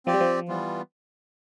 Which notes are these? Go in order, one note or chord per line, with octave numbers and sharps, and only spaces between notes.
F3 C4 G4 D5
G3
F3
E3 G3 B3 F4